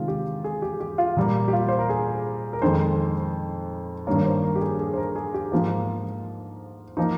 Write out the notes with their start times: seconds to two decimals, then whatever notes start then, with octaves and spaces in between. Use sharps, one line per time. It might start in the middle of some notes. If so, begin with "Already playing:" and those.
Already playing: C3 D#3 G#3 F4
0.08 G4
0.44 G#4
0.62 G4
0.80 G4
0.98 F4
1.17 A#2 G3 A#3
1.48 G4
1.53 F4
1.68 C5
1.79 A#4
1.89 G#4
2.53 A#4
2.62 F2 D#3 G#3 C5
4.07 G2 D#3 G3 A#3 C#5
4.18 A#4
4.25 C5
4.44 A#4
4.55 G4
4.61 G#4
4.79 G#4
4.93 C5
4.97 A#4
5.16 G#4
5.34 G4
5.52 G#2 F3 A#3 F4
6.97 F3 A#3 D#4